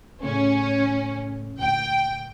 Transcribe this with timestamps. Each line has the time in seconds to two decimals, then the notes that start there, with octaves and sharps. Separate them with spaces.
0.23 A2 C#3 A3 C#4
1.59 D2 A#2 G5